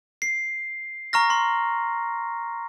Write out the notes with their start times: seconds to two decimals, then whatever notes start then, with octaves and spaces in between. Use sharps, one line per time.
0.22 C7
1.13 A#5 C#6 F6 A#6
1.30 C6